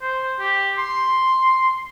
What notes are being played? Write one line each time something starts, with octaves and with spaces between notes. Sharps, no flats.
C5
G4
C6